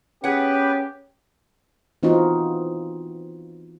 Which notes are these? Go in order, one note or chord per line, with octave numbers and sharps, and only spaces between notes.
B3 C#4 G4 G#4 B4 F#5
E3 B3 C4 D#4 F4 F#4